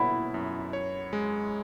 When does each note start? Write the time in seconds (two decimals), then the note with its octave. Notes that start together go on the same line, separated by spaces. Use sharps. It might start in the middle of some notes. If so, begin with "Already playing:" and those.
Already playing: B2 E4 F#5 B5
0.34 F#2
0.73 C#5
1.13 G#3